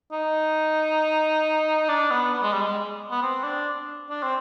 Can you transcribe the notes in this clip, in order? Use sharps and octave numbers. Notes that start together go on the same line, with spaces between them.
D#4
D4
B3
B3
G#3
G3
G#3
B3
C4
D4
D4
C4